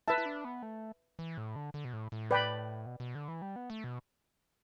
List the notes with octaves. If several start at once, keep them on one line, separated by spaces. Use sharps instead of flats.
E4 B4 E5 A5
E4
D4
B3
A3
E3
A2
D3
D3
B2
A2
A2
B4 D5 G5 B5
B2
B2
D3
E3
G3
B3
A3
B2